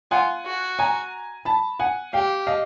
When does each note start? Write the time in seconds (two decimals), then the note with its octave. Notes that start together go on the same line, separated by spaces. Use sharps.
0.11 F4 F#5 G#5
0.46 F#4
0.79 G#5 A#5
1.45 A5 B5
1.79 F#5 G#5
2.13 G4 F5 G5
2.47 D#5 F5